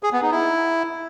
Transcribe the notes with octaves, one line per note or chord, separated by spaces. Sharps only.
G#4
B3
D#4
E4